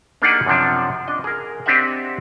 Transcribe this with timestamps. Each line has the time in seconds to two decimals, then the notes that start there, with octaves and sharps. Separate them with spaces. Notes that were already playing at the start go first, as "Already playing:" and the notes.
0.22 A#3 D4 D#4 G4 G#4 F#5
0.46 F#2 C3 F3 D4
1.08 D4 D#5
1.24 G#4 A#4
1.66 C4 D4 G4 D#5 E5 F#5